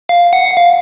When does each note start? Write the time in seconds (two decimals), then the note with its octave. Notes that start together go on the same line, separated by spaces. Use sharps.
0.09 F5
0.33 F#5
0.57 F5